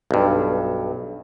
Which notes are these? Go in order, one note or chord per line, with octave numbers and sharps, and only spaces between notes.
B1 G2